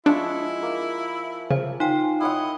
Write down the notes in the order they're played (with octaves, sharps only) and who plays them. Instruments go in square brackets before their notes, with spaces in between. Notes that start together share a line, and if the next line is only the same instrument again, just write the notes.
[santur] F3 G#3 C#6 [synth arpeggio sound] D4 [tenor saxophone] E4
[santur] A#3
[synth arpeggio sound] C#3 [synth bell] C5
[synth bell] D#4 G5 [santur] F4
[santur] E4 C#5 F#5 [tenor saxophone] D#5